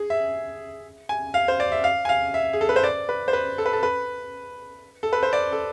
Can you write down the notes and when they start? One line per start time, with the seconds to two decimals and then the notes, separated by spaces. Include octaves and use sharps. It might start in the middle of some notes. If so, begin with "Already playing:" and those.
Already playing: G#4
0.10 E5
1.09 G#5
1.34 F5
1.48 C5
1.60 D5
1.72 E5
1.84 F5
2.05 G#5
2.09 F5
2.34 E5
2.53 G#4
2.61 A4
2.69 B4
2.76 C5
2.84 D5
3.09 B4
3.28 C5
3.33 B4
3.58 A4
3.66 B4
3.73 A4
3.83 B4
5.03 A4
5.13 B4
5.23 C5
5.33 D5
5.52 A4